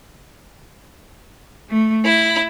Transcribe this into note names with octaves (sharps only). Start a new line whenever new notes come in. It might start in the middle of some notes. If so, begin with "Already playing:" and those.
A3
E4